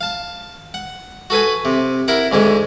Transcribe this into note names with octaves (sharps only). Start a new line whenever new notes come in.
F5 A5
F#5
F#4 A4 B4 G#5
C3
E4 A#4 F#5
D2 G#2 D3 G#3